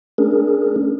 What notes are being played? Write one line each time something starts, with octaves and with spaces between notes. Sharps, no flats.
A3 C#4 D4 G#4 A#4